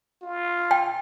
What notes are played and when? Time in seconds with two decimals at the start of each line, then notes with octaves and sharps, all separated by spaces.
0.23 F4
0.71 G5